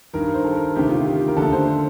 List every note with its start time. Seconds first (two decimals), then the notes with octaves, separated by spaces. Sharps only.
0.13 G2 D#3 A#4
0.34 C5
0.44 A4
0.55 A#4
0.75 D2 C3 D#3 G4
0.91 F4
1.06 G4
1.28 A#4
1.37 D2 D3 A4
1.53 C5
1.67 C5